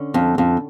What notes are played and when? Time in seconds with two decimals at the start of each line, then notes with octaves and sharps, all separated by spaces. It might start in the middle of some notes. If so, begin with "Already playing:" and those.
Already playing: D3 C#4
0.14 F2
0.38 F2